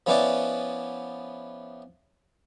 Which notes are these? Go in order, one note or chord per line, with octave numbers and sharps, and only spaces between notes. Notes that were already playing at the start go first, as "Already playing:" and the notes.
F3 B3 C#4 E4 B4 D5